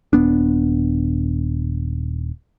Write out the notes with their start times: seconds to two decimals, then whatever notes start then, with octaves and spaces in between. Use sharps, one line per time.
0.13 D#1 B3 D4